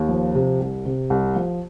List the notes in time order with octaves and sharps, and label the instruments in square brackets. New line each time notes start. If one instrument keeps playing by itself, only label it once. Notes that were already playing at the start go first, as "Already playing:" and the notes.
Already playing: [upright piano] D#2
F3
C3
C2
C3
C2
F3